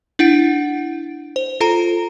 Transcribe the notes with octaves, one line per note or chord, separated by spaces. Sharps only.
D4 E4 F#5 D7
C5
F4 A4 A#5